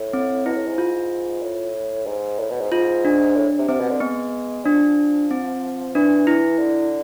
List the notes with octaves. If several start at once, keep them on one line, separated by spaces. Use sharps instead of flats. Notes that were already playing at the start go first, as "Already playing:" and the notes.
Already playing: A2
C4
B2 E4
A2
G#2
F4
A2
G#2
A2
B2
G#2
G#2 F4
D4
A2
C3
C3 C4
B2
D3
G#3 B3
F3 D4
C4
E3 D4
E4
D3